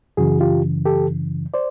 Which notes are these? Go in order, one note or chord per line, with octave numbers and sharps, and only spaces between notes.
F#2 C#3 E3 F#4 G#4
F4 G4
G4 A4
C5 D5